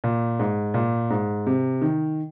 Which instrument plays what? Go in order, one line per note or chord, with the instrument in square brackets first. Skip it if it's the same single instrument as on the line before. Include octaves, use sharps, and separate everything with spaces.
[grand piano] A#2
G#2
A#2
G#2
C3
D#3